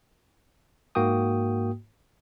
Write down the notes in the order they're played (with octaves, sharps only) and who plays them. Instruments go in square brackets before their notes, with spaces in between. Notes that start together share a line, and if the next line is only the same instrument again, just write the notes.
[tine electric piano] G#2 A#3 F#4 G5 D#6